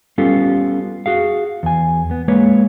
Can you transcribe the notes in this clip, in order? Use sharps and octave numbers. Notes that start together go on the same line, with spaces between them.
G3 B3 C#4 F4 G4 A4
F#4 G#4 F5
E2 G#5
B3
G#3 A#3 B4 C#5